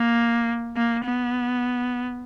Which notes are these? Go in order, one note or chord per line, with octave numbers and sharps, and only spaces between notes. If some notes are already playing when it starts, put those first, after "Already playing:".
Already playing: A#3
A#3
B3